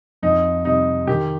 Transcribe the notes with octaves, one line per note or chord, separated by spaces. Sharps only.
F2 D#4
C3 G3 D#4
D#3 G4